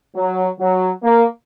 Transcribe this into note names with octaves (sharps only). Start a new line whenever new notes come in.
F#3
F#3
A#3